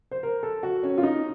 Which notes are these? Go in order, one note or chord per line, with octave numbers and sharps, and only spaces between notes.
C5
A#4
A4
F#4
C#4
F4
D#4